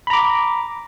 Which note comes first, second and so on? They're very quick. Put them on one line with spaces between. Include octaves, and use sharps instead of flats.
B5 A#5 D6